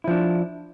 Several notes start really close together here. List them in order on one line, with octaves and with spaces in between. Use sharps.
E4 F3 D4